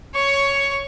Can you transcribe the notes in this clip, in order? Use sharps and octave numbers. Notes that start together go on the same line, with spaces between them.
C#5 C#6